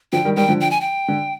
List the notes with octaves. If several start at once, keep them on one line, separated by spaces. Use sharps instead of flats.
D3 F3 G5
D#3 G3
D#3 G3 G5
D3 F3
G5
G#5
G5
D3